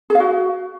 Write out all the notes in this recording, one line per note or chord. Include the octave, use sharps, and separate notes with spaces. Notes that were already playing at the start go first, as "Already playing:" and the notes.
G#4
F5
F#4